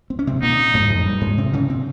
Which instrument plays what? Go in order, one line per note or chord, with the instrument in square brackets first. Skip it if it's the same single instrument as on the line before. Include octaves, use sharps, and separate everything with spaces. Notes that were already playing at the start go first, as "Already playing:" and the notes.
[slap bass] C4
C#4
C3 C4
[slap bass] A#2 A#3 [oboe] D#4
[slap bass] G#2 G#3
F2 F3
G2 G3
G#2 G#3
C3 C4
C#3 C#4
C3 C4